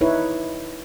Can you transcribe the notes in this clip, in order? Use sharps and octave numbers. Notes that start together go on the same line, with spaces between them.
D#4 E4 B4 C#5